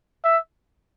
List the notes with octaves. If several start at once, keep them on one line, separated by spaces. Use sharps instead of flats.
E5